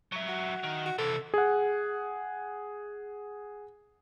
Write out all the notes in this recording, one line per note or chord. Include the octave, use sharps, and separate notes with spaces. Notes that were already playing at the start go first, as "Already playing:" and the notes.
F#3 E5
F#4
D#3
F#4
C3 E3 A4
G#4 F#5